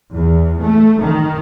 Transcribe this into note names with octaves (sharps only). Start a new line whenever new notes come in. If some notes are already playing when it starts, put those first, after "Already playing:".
E2
A3
D#3